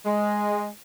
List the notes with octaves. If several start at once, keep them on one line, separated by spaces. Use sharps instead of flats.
G#3